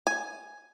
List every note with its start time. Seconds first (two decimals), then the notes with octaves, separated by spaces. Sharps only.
0.07 G#5